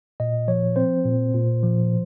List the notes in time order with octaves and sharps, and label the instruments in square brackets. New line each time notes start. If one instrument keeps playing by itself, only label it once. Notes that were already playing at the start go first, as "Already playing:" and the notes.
[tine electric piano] A#2 D#5
F3 C#5
C4 C5
A#2
A#2
F3